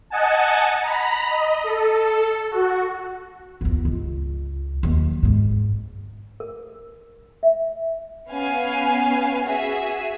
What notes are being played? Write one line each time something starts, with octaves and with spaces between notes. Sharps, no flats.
D#5 F#5 G#5 A5
A#5 B5
D#5
A4
F#4
G1 D#2
C#2
D#2 F#3
G#1 G#2
A#4
E5
B3 C#4 F5 G#5
F#4 G#4 E5 G#5